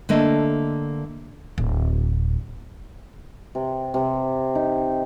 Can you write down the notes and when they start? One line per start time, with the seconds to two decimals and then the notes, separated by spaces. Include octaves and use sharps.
0.09 D3 A3 A#3 D#5
1.58 D1
3.55 C3
3.94 C3
4.55 D#4